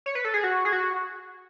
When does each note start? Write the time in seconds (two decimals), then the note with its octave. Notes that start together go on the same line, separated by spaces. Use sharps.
0.06 C#5
0.15 B4
0.25 A4
0.34 G#4
0.43 F#4
0.65 G#4
0.72 F#4